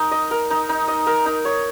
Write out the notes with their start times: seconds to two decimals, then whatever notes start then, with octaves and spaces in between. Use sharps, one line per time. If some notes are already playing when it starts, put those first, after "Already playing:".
Already playing: D#4 A#4
0.11 D#5
0.31 A#4
0.50 D#4
0.69 D#4
0.88 D#5
1.07 A#4
1.26 D#4
1.45 C#5